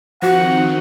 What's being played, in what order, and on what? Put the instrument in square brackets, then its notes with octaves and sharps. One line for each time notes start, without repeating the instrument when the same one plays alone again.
[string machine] D#3 C4 D#4 [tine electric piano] F3 [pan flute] F#4 [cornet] F#5